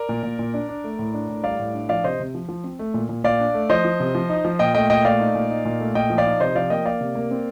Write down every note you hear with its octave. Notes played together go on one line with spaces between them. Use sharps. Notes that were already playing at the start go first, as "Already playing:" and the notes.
Already playing: A#4 D5
A#2
A#2
A#2
D4
D4
A3
A2
D4
A2
G3 D5 F5
A2
D4
F3 D5 F5
C3 C5 D#5
C3
F3
F3
C4
A3
A#2
A#2
A#2 D5 F5
D4
A3
F3 C5 D#5
F3
C3
F3
D#4
F3
A#2 D#5 G5
A3 D#5 G5
A#2 D#5 G5
A3 D5 F5
D#4
A#2
D#4
A#2
A3
A#2 D#5 G5
F3
D5 F5
D#4
C3 C5 D#5
F3 D5 F5
A#3 D#5 G5
A#3 D5 F5
C3
A#3
C4